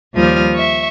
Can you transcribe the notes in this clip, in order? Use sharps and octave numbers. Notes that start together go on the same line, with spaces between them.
D#2 F3 G3 D#6 F6
E5 C#6